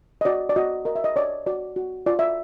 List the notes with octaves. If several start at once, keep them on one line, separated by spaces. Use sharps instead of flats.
D#5
F#4 D5
D5
F#4 D#5
A#4 D#5
E5
D#5
C#5 D5
F#4 D5
F#4
F4 D5
E5